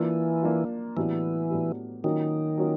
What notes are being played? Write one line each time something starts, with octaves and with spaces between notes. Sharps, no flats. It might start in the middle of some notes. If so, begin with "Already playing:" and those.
Already playing: E3 A#3 D4 F4
A#3 D4 F4
A2 E3 F#3 B3 D4 G4
A2 F#3 B3 D4 G4
D#3 F#3 A#3 C#4 F4
F#3 A#3 C#4 F4